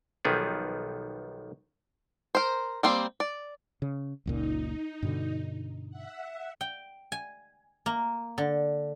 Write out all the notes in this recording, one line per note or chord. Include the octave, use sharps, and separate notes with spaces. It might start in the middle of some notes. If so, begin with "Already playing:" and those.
B1 D#3 F3 G3 B3 G#4
A#4 C5
G3 A#3 C4 C5
D5
C#3
F#1 C#2 A#2 D#4
G2 B2 D3
E5 F#5
G5
G#5
A#3
D3